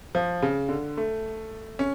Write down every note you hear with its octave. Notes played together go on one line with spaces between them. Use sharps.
F3
C#3
D3
A3
C#4